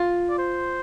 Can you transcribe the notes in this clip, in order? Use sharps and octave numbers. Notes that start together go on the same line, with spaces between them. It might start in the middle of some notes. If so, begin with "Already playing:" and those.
Already playing: F4
D5
C5